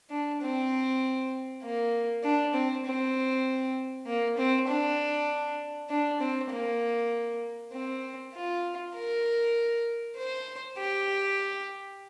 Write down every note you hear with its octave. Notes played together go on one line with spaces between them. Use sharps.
D4
C4
A#3
D4
C4
C4
A#3
C4
D4
D4
C4
A#3
C4
F4
A#4
C5
G4